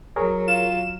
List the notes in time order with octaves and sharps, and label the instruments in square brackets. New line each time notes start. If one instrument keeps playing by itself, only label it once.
[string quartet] F#3 [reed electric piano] G#4 A#4 C#5
[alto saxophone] F4 [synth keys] E7